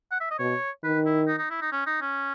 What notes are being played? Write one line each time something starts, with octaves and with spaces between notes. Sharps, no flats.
F#5
E5
D#5
B2 C#5
D#3 B4
E4
D#4
D#4
E4
D#4
C#4
D#4
C#4